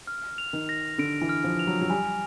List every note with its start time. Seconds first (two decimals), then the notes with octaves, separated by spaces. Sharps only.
0.07 F6
0.38 F7
0.53 D#3
0.69 A#6
0.98 D3 D7
1.21 E3
1.29 F6
1.44 F3
1.59 F7
1.67 F#3
1.81 F#3
1.90 G3 G#5